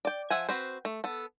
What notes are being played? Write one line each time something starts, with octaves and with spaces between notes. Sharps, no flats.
D5 G5
F3 E5 F#5 G#5
C4 F#4 B4 C5
A3
B3 A4